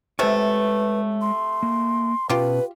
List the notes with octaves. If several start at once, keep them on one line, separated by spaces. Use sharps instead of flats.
C3 G#3 A3 A4 B4 C#5
C6
A#3
B2 C#4 F4 G4 B4 A5